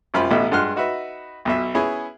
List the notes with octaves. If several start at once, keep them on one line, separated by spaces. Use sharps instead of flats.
C2 F#2 F4 C5 B5
A1 B2 A3 D#4 E5
G2 G#3 F#5 C6 F6 F#6
D#4 F#4 B4 E5
B1 B2 E5
B3 C#4 E4 G#4